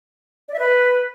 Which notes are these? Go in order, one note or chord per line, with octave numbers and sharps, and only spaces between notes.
D5
E5
B4